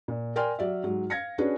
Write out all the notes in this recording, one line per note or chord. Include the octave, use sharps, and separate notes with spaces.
A#2
A#4 D5 G5 G#5 C6 F6
F#3 D5 E5
G#2 F#3
F5 G#6 A#6 C#7
C#4 D4 F#4 G#4 B4